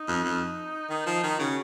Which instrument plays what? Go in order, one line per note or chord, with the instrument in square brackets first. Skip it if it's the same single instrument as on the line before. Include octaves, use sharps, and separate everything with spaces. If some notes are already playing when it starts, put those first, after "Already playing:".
Already playing: [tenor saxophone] D#4
[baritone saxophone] F2
F2
D#3
F3
D#3
[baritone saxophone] C#3 [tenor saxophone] F#4